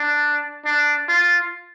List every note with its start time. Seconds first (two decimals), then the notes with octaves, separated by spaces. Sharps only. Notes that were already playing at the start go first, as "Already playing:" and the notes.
Already playing: D4
0.66 D4
1.08 F4